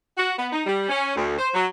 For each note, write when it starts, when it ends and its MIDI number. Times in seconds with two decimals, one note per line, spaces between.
0.17 0.32 66
0.37 0.46 59
0.52 0.62 63
0.66 0.84 55
0.88 1.15 61
1.15 1.36 38
1.38 1.48 72
1.54 1.65 54